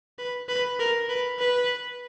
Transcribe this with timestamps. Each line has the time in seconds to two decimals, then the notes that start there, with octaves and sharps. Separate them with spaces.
0.19 B4
0.49 B4
0.80 A#4
1.09 B4
1.40 B4